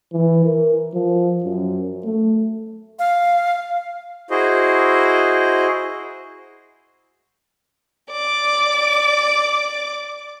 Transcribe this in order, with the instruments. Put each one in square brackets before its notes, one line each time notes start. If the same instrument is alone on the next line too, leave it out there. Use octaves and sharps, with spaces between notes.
[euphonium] E3
A#4
F3
F#2
A3
[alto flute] F5
[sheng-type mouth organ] E4 F#4 G#4 C5 D#5
[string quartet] D5 D6